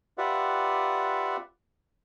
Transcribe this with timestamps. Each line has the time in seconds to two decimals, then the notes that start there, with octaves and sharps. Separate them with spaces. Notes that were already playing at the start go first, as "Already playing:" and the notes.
0.18 F4 G4 B4 D5 E5 F#5